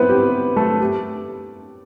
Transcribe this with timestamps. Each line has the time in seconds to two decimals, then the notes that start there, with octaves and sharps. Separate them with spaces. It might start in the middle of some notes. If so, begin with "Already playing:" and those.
Already playing: B3 C4 E4 B4
0.09 G4
0.56 A3 A4
0.80 G4